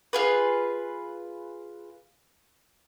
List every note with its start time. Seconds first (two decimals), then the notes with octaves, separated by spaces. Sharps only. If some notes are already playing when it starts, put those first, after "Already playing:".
0.13 F4 G#4 B4